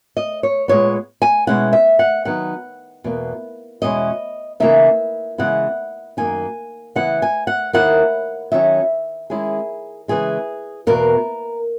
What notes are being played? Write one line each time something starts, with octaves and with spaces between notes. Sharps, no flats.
D#5
C#5
A#2 G#3 B3 C#5
G#5
B2 G#3 C#4 E4 F#5
E5
F#5
D#3 F#3 B3 D#4 F#5
E2 B2 A#3
E2 B2 G#3 C#4 E4 D#5
C#3 E3 A#3 D#4 E5
C#3 E3 G#3 B3 E4 F#5
F#2 D#3 A#3 D#4 G#5
C#3 E3 B3 E4 F#5
G#5
F#5
D#2 D#3 A#3 E4 F#5
D#3 F#3 C#4 E4 E5
D#3 G#3 C#4 E4 G#4
C#3 E3 G#3 G#4
E2 B2 A#3 A#4